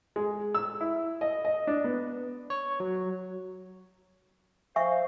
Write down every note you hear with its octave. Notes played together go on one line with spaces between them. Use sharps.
G#3
E6
E4
D#5
D#5
D4
B3
C#5
F#3
C5 E5 F5 G#5 C#6